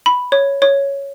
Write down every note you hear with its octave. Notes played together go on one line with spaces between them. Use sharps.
B5
C#5
C#5